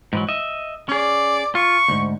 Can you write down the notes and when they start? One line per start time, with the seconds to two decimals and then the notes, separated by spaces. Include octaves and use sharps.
0.13 G#2 E3 F#3
0.29 D#5 E5
0.89 C#4 G#4 D5
1.55 F4 C#6
1.88 D2 G#2